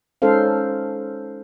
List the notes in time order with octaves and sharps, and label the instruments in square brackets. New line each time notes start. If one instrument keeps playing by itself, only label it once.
[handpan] G#3 C#4 D#4 A4 C5 F5